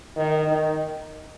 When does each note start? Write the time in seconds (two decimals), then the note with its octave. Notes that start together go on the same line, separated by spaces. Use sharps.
0.16 D#3
0.47 D#3